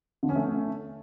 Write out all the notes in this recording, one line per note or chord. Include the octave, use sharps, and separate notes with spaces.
D3
C#4
A3